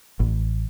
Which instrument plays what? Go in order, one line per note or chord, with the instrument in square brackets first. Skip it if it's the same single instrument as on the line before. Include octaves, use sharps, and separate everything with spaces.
[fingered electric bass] A1